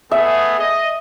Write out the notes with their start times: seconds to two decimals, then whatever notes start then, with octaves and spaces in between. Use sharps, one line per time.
0.11 A3 B3 G#4 E5
0.59 D#5